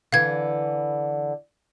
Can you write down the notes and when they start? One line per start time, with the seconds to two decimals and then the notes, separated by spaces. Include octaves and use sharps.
0.12 D3 E3 F5 G#6